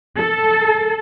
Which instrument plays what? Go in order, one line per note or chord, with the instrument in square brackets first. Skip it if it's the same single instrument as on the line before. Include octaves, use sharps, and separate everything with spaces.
[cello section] A4